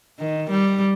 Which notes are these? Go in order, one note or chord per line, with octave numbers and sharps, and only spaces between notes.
D#3
G3